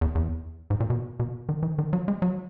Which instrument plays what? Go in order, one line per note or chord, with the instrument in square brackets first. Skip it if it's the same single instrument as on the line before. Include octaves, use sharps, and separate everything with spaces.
[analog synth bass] E2
E2
G#2
A#2
B2
B2
D#3
E3
D#3
F#3
G#3
F#3